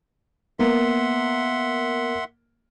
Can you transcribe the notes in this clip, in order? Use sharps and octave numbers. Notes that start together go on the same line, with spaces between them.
A#3 B3 E5 F#5 C6